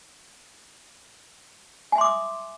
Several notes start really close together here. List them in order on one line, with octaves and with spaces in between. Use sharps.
G#5 E5 C6 D6 D#6